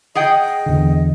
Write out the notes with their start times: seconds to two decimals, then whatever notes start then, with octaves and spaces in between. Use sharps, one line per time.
0.15 G#4 D#5 F#5 G5
0.66 E2 D3